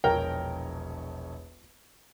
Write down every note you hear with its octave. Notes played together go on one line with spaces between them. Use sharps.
E1 A#1 A#4 C#5 G5